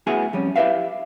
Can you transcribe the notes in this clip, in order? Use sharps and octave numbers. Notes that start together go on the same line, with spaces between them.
A3 B3 E4 F#4 G#4 G#5
F2 G3 C#4
E4 G4 G#4 B4 E5 F5